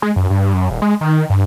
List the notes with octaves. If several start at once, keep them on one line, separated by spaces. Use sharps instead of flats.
G#3
F#2
G2
F#2
D#1
G#3
D#3
G2